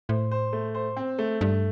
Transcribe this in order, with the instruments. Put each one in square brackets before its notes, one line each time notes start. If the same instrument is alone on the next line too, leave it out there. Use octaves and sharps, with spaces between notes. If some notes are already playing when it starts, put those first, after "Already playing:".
[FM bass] A2 [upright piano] C5
[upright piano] C5
A3
C5
C4
A3
[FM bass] G2 [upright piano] A3